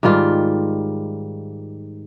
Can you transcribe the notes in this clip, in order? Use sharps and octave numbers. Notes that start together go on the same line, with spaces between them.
G#2 D#3 G3 F4